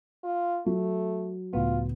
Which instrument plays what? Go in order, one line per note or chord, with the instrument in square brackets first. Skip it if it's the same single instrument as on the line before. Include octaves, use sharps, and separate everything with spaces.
[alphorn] F4
[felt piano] F#3 [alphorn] A3
[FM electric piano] C#2 A2 B3 [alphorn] F4